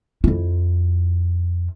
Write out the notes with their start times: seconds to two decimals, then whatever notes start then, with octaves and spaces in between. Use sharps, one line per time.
0.24 F2 E4